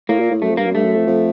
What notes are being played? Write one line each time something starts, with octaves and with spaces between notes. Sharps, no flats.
A2 A#3
A#2
A2
F#2 A3
F2
G2 A#3
F#2
G2 A3
F#2
F2
F2